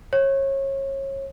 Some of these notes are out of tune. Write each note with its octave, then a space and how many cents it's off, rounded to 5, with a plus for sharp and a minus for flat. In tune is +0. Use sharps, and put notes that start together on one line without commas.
C#5 -30